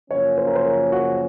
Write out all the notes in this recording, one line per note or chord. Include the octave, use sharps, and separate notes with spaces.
F#2 C#3 F3 A#3 C#4 C#5
C5
A#4
C5
A#4
F#4